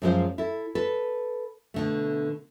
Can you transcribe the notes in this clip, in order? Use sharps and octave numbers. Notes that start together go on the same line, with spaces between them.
F#2 F3 G#3 A4 C5 F5
E4 A4
A4 B4
B2 D3 A3